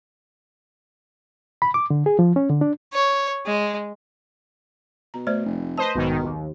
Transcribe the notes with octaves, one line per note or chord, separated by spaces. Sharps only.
B5
D6
D3
G#4
F3
C#4
D3
D4
C#5
G#3
B2 A#5
A3 C5 D5
F1
B4 C5 D#5 A5
B1 G#2 B2 D#3
D#2